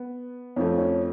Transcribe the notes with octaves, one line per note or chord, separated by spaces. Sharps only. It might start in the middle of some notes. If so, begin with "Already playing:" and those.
Already playing: B3
F2 F3 A3 C#4
C#4